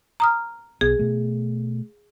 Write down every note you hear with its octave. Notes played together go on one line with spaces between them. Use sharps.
A#5 D#6 F6
B1 B3 G#4
B2 A3